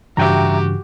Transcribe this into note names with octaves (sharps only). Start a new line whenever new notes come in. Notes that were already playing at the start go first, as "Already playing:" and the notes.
G2 C#3 E3 F#4 G4 E5 G5 A#5